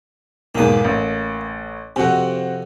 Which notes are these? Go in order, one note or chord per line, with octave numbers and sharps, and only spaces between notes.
B1 E2 G#2 A#3 D#6
A1
F2 C3 C4 F#4 F#5